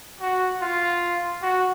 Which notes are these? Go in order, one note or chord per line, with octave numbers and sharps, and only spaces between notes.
F#4
F4
F#4